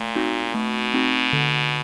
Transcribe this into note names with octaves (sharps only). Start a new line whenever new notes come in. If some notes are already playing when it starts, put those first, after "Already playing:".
Already playing: A#2 A3
C4 D#4 F#4
B2 A3
C4 D#4 F#4
D3